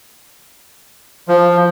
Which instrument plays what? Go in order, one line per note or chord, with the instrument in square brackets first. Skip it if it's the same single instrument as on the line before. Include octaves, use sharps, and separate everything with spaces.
[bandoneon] F3